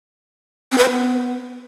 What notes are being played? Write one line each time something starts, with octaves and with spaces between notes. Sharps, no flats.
C4
B4
C5
B3